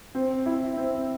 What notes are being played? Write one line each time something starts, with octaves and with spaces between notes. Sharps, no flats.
C4
E4
C4